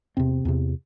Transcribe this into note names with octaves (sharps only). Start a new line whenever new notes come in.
E2 C3 C4
E2 C3